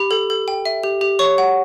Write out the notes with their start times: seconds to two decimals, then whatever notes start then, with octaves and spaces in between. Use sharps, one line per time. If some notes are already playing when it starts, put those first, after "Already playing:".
Already playing: G4 B5
0.11 A4
0.30 A4
0.48 G5
0.65 E5
0.83 G4
1.01 G4
1.19 C#5 C#6
1.38 F#5